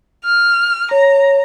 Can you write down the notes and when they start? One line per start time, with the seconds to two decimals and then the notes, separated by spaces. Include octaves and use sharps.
0.24 F6
0.91 C#5 A#5